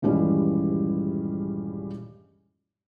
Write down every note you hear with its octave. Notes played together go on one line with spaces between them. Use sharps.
D#1 G2 E3 G3 G#3 C#4